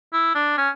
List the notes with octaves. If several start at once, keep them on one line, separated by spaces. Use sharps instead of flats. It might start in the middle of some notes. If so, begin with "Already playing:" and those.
E4
D4
C#4